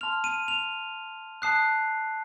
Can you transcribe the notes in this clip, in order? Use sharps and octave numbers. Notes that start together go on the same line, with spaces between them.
A5 C6 F6 F7
D#7
F7
A5 D#6 F#6 C7